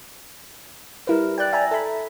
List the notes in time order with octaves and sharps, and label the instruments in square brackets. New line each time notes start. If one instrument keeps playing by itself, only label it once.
[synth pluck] G3 E4 B4 [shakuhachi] A#4
[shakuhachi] D5 [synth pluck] G5 F#6
[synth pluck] E5 G#5 A#5
[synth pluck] A4 B5 [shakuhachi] E5